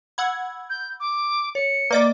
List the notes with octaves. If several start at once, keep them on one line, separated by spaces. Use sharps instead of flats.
F#5 B5 E6 G#6
G6
D6
C#5 C#7
A#3 B4 D5 D#5 D6 A6